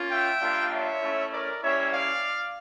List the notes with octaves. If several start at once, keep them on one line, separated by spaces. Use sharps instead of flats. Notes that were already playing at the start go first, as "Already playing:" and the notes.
Already playing: A#3 C#4 F4
E5 G5
G3 A#3 D4 F4
C#5 E5
A3 C#4 E4
A#4 D5
G3 A#3 C#4 E4 C#5 E5
D5 F5